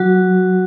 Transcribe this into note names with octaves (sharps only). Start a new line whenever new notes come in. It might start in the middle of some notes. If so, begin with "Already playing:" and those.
Already playing: F#3 F#4